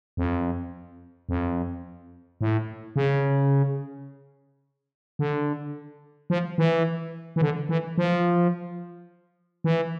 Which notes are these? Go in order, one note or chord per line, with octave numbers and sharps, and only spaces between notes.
F2
F2
A2
C#3
D3
F3
E3
E3
D3
E3
F3
E3